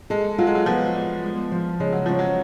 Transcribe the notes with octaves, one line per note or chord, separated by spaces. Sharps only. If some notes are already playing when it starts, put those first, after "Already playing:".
G#3 A4
F#3 F4
G#3
F#3
F3 B3
D5
G#3
F3
C#3 G#3
F#3
F3 C#4
F#3